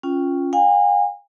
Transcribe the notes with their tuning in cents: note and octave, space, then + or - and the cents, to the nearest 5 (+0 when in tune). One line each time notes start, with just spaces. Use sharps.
C#4 +0 F4 +0 G5 +0
F5 +45 G#5 -40